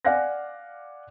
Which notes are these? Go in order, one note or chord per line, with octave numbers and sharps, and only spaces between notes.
D5 F5 F#5 G#5 F#6 A#6